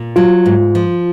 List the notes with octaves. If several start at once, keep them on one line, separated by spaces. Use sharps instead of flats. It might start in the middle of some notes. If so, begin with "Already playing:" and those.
Already playing: A#2
F#3 F4
G#2
F3